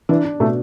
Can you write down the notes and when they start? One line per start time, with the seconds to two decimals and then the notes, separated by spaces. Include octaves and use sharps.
0.09 E3 D4
0.24 D4
0.40 B2 A3